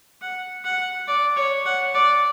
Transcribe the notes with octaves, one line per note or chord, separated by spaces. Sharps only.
F#5
F#5
D5
C#5
F#5
D5